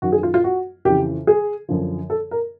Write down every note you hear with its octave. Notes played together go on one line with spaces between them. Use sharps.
F#2 D#3 F#4
G#4
F4
F4
F#4
F2 C#3 E3 G4
G#4
F#2 D3 F3
A4
A#4